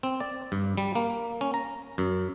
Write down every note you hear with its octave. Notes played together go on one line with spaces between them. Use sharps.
C4
D5
G2
G3
A#3
C#4
A#5
F#2